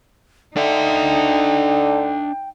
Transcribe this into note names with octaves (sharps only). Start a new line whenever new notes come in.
D3 D4 D#4 E5 G5